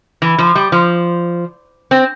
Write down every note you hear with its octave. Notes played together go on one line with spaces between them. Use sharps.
E3
F3
G3
F3
C4